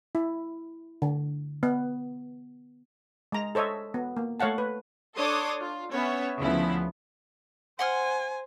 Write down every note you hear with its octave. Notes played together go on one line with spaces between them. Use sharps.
E4
D3
B3
G#3 A#5
A4 C5 C#5 D#5 E5
B3
A#3
A3 C#5 F5 F#5 A5
B4
D4 A4 C#5 C6 D6 D#6
F4
B3 C#4 C#5 E5
D2 C#3 F3 B3 E4
C5 F#5 G#5 C6 F6